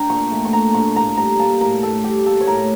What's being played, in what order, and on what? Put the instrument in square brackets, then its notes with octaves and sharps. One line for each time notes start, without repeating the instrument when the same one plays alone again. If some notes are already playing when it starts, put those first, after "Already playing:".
Already playing: [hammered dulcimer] D4 G5 A#5
A#2 C#6
A3
C#6
D4 A#5
A#2 C#6
A2 A#5
G3 A#5
A#3 A5
A2 A#4
A2 A4
G3 G4
A#3 A4
C#5
A2 A#4